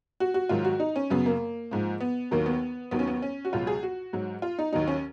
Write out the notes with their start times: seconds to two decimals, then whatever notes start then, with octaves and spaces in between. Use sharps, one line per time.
0.20 F#4
0.34 F#4
0.49 G#2 D#3 F#3 F4
0.65 F#4
0.80 D#4
0.96 C#4
1.10 F#2 C#3 F#3 B3
1.26 A#3
1.71 G#2 F3
2.01 B3
2.31 D#2 D#3 F#3 A#3
2.46 B3
2.91 D#2 D#3 F#3 B3
2.99 C#4
3.08 B3
3.22 C#4
3.45 F#4
3.53 C#2 B2 F#3 F4
3.67 G#4
3.83 F#4
4.13 G#2 F#3
4.42 F4
4.59 D#4
4.73 D#2 D#3 F#3 D#4
4.88 C#4